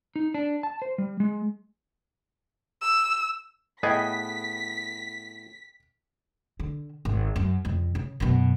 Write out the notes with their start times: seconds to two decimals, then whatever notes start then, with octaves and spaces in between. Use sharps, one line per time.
0.16 D#4
0.34 D4
0.63 A5
0.82 C5
0.98 G3
1.20 G#3
2.81 E6
3.83 A2 B3 G#4 D#5 G5 B6
6.59 D3
7.05 G#1
7.36 F#2
7.65 F2 C#3
7.95 C#3
8.20 F#2 B2